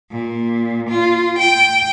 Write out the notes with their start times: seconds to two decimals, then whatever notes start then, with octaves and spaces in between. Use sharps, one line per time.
0.11 A#2
0.89 F4
1.39 G5